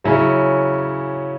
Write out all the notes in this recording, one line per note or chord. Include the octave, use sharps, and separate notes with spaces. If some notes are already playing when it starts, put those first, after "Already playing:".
C#3 F#3 C#4 E4